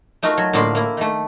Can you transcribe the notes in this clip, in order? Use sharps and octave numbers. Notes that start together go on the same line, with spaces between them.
A3 D#4 F4 F#4 A#4
F#3
A2 D3 A#3 F4 B5 C6
A#3 E4
D#3 A3